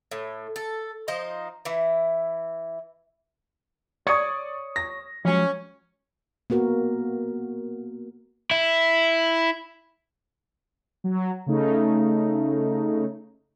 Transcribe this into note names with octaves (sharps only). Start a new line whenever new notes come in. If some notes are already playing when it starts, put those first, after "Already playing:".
A2
A4
F3 D#4 C5 D#5
E3 E4
C#5 D5 C#6 D#6
A#6
F3 F#3 G#3 C#4
A#3 B3 F#4 A#4
E4
F#3
C#3 A3 D#4